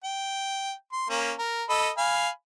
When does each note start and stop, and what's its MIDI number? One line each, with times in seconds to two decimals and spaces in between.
0.04 0.72 79
0.92 1.08 84
1.10 1.32 58
1.10 1.32 61
1.39 1.63 70
1.69 1.90 69
1.69 1.90 75
1.69 1.90 83
1.97 2.29 77
1.97 2.29 80
1.97 2.29 83